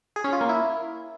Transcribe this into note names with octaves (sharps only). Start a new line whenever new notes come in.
G#4
C#4
F4
A#3
E4